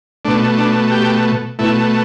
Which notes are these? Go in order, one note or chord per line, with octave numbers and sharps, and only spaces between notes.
B2 A3 D4
D4
G4
B2 A3 E4